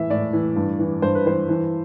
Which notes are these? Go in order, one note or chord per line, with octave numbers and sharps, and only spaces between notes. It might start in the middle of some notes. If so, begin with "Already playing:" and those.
Already playing: A2 E3 E5
A2 D5
E3
G2
E3
G2 C5
B4
E3 C5
E3